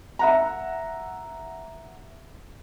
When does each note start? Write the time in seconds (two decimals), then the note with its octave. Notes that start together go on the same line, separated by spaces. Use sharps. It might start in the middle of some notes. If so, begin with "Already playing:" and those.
0.19 E5 F#5 A#5